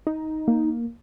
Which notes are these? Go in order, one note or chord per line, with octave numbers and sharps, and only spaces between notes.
D#4
A#3